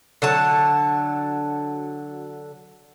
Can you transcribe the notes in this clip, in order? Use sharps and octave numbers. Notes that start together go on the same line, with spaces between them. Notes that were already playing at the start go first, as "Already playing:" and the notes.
D3 F#3 A5